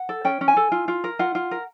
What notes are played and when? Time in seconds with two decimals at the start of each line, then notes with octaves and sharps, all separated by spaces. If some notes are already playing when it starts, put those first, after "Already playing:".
Already playing: F#5
0.09 A4
0.25 C#4 G5
0.41 C#4
0.48 G#5
0.57 A4
0.72 F4
0.88 F4
1.04 A#4
1.19 F4 F#5
1.35 F4
1.51 A#4